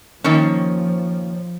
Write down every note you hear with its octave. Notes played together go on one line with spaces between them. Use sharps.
D#3 F3 A#3 C#4